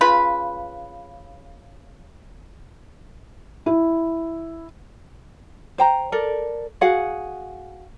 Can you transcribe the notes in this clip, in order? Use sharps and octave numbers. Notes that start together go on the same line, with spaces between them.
C#3 F4 B4 B5
E4
C5 G5 A#5
A4 A#4 D5
F#4 G#4 F5 F#5